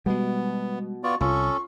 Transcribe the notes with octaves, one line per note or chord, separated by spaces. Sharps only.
B2 G3 G#3 B3
B3 F4 D5 C#6
C2 C#4 F4 A4 C#6